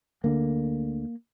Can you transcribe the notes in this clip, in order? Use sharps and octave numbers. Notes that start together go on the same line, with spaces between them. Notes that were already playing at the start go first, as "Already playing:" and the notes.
D2 D3 A#3